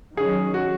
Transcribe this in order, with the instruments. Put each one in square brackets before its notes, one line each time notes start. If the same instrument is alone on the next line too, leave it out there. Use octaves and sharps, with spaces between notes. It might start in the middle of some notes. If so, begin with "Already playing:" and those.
[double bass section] D#3 F#3 C#4 [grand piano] G#4
[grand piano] F#4